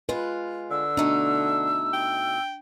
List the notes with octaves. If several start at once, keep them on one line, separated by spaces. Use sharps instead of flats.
G#3 F4 B4
D3 E6
B2 A3 D4 D#4
G5